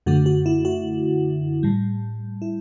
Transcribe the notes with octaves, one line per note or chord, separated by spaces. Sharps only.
F#2 D3 A3 F#4
F#4
E4
F#4
A2 G3
E4